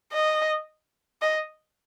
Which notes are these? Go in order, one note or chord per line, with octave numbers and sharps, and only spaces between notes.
D#5
D#5